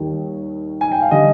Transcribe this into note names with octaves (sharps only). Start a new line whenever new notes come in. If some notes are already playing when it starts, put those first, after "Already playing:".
Already playing: D#2 D#3 G3
G#5
G5
F5
D3 G3 D#5